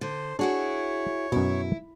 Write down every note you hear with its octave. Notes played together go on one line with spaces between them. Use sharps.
D3 C5
D4 E4 F#4 G#4 C#5
F#2 B2 E4